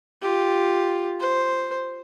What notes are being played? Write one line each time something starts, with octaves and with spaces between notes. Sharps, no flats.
F4 G4
C5